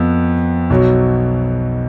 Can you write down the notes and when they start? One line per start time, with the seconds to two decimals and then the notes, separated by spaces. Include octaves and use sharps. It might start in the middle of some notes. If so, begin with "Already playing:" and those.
Already playing: F2 F3 B3
0.70 B1 B2 F#3